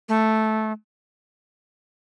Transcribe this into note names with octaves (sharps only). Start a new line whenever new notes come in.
A3